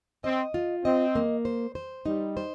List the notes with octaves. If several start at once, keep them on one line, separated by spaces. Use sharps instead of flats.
C4 D#5
F4
C4 D#5
A#3
C5
C5
G3 D#4
C5